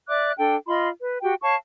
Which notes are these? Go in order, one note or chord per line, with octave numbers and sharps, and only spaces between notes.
D5 E5 D6 F#6
D4 A4 G5
F4 D#5 B5 C6
B4
F#4 G4 G5
C#5 F5 A5 C#6